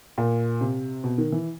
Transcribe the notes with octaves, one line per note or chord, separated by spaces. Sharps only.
A#2
C3
B2
D#3
E3